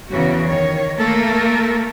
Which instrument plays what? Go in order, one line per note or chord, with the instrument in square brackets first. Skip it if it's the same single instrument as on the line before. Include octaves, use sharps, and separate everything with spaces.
[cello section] E2 C#3 E3 F#4
D#3 C#5
A3 A#3 A4 A#4